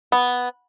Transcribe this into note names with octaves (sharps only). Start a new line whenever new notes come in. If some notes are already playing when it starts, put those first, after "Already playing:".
B3